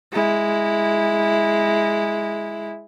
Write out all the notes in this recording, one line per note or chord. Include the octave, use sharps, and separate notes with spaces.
G#3 E4